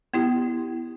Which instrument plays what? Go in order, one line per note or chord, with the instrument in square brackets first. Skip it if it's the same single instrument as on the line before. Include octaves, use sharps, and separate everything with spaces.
[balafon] B3 E4 G4